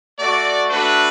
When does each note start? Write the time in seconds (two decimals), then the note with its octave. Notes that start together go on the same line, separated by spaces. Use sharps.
0.19 A3 F#4 D5
0.71 A3 D4 F#4 B4